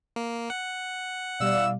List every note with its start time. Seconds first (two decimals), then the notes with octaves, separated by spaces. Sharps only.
0.16 A#3
0.50 F#5
1.40 B2 G3 E4 D5 F5 E6